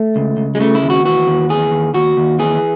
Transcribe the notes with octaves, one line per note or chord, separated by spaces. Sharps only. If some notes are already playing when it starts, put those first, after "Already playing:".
Already playing: A3
C#2
C#2
G#3
C#3 A3
E4
D#2
F#4
E3 F#4
D#2
E3 G#4
D#2
D#2 F#4
D#2
E3 G#4